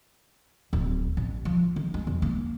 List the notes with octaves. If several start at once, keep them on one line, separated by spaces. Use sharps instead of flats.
D1
A1
F3
D#3
G#3
E2
A#3